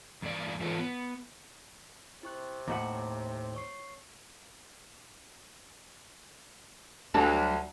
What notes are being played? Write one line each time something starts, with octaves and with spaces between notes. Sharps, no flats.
E2 G2 A#3 D5
G#2 E3 F4 A4 B4 C#5
B3
C3 E4 C#6 F#6
D#2 A2 F#5 A#5 D6
C#5 C#6 C7
D2 F#3 G3 D4